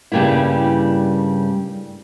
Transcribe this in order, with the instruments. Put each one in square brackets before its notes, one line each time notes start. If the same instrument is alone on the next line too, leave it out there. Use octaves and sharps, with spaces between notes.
[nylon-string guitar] G2 C#3 G3 A#3 E4